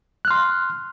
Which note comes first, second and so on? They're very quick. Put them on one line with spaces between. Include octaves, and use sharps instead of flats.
F#6 F6 C6